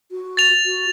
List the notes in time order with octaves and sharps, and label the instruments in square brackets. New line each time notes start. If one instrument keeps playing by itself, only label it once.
[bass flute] F#4
[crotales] A6 F7
[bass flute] F#4